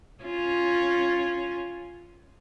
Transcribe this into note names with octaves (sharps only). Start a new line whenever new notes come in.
C#4 F4